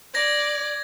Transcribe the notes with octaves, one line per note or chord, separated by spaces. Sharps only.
D5 G#6 A#6